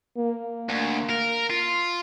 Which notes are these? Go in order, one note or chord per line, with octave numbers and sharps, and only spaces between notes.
A#3
D2
A#4
F4